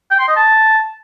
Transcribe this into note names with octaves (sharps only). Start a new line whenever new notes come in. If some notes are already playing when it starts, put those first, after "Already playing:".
G5
C6
D#5
A5